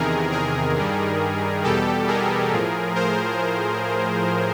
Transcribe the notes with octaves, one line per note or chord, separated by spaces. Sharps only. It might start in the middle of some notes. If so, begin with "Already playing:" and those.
Already playing: E2 C3 D#3 G#4 A#4
G#4 A#4
G2 D#3 G3
E2 B2 G3 G4 A4
G#4 A#4
A2 F3
A#4 C5